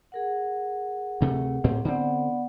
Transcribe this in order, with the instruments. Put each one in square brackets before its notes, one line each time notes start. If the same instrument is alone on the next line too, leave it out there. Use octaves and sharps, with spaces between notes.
[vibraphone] G#4 A#4 F#5
[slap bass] D2 C3 A3
D2 A2 C4
[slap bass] D3 C4 [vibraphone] B3 D5 F#5